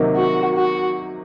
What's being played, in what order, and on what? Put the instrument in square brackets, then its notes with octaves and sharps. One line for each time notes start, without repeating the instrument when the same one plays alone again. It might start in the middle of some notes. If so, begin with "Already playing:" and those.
Already playing: [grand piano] C3 D#3 F#3 A#3 D#4
[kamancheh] F#4
F#4